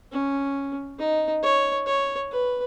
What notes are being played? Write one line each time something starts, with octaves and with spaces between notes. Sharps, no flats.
C#4
D#4
C#5
C#5
B4